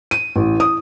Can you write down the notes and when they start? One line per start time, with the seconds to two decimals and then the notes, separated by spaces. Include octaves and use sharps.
0.11 D#7
0.36 A1
0.60 D#6